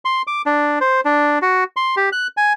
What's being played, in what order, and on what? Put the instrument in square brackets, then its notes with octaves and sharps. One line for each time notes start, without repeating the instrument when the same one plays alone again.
[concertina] C6
D6
D4
C5
D4
F#4
C6
G4
F#6
G#5